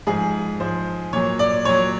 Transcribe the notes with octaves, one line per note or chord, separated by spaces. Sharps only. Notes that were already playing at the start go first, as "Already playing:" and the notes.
G#2 F3 G#4
G#2 F3 C5
A#2 F#3 C#5
D5
A#2 F#3 C#5